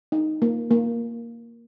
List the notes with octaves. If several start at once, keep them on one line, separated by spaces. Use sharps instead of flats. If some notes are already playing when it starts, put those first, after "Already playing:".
D#4
A#3
A#3